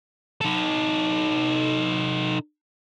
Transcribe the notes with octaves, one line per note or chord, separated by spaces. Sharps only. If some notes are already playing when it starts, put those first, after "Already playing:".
D#4 A4